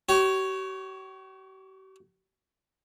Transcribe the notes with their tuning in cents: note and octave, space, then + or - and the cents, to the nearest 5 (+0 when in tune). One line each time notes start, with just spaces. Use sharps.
G4 -45 C#5 +0